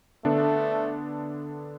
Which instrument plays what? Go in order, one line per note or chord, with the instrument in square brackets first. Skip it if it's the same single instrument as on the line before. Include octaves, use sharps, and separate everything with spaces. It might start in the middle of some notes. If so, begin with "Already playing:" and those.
[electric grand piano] D3 B3 D4 A4 [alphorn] A3